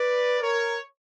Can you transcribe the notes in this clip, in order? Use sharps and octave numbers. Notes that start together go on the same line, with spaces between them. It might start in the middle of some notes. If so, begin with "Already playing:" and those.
Already playing: B4 D5
A#4 C#5